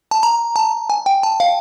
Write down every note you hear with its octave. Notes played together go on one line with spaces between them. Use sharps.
A5
A#5
A5
G#5
G5
A5
F5